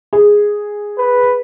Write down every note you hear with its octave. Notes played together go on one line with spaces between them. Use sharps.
G#4
B4